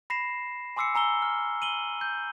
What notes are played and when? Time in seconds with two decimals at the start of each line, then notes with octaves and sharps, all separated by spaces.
0.10 B5 A#6 C7 E7
0.76 G#5 C6 D6 E6 C7 C#7
0.95 G#5 A#5 E6 G7
1.22 F6
1.62 D#7 F#7 G7
2.01 G6